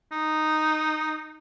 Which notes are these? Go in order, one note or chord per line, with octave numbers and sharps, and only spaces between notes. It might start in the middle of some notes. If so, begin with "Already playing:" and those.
D#4